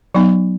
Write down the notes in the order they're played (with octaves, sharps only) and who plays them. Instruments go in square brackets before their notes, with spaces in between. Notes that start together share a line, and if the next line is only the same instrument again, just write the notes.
[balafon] F#3 B3 D#4